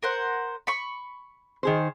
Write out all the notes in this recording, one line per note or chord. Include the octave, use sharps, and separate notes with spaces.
A#4 C5 F#5
B5 C#6
D#3 G#4 C5